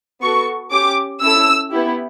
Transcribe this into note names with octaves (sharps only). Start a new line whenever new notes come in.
B3 F#4 A4 C#6
C#4 G4 D6
C#4 E4 A4 E6
B3 E4 G4